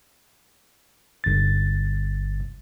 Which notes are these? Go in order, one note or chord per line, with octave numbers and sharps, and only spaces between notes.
G1 A6